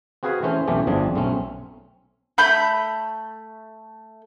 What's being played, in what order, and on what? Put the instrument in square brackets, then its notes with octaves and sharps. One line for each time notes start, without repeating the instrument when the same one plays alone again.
[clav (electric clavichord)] C4 F#4 G#4 B4 F5 G#5
E3 A3 C#4 C5
B1 F2 E3 A3 C#4 G4
G1 F2 F3 C4 D4 G#4
B1 A3 C4 C#4
[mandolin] A3 B5 G6